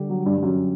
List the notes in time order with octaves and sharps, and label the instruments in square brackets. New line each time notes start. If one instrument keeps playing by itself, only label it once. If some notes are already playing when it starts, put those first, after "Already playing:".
Already playing: [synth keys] D3 G3 G4
[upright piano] F#3
G2
G2
F#2